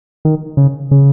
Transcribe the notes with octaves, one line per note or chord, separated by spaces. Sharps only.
D#3
C#3
C#3